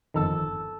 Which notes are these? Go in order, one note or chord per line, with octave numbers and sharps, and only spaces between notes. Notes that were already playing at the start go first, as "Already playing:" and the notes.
G1 F2 D#3 A4